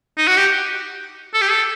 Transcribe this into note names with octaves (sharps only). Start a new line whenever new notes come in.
D#4
F#4
G4
A4
G4
A4